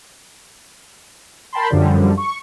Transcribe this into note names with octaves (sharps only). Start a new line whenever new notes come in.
A#4 G5 A5 B5 C6
F#2 D3 F3 G3
C#6